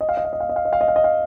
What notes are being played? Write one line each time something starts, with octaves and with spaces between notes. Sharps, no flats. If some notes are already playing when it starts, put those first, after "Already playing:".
D#5
F5
D#5
F5
D#5
F5
D#5
F5
D#5
F5
D#5
F5
D#5
F5